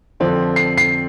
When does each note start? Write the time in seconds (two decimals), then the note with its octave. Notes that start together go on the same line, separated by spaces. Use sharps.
0.20 F2 D3 F3 C4
0.56 C7
0.78 C7